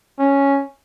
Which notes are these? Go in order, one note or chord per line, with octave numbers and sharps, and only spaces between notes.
C#4